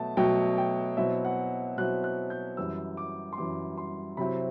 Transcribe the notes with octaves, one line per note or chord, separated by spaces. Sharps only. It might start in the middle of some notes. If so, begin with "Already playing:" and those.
Already playing: B2 F#3 A3 A5
B2 F#3 A3 G5
G5
B2 F#3 C4 E4 E5
F#5
B2 F#3 C4 E4 F#6
F#6
G6
F#2 E3 G3 E6
D6
C6
F#2 E3 G3 D6
C6
C3 F#3 C4 E4 B5